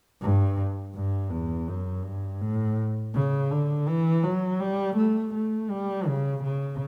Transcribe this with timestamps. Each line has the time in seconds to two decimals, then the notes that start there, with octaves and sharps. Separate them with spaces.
0.21 G2
0.95 G2
1.31 E2
1.68 F#2
2.04 G2
2.41 A2
3.14 C#3
3.51 D3
3.87 E3
4.24 F#3
4.60 G3
4.97 A3
5.34 A3
5.70 G3
6.07 C#3
6.44 C#3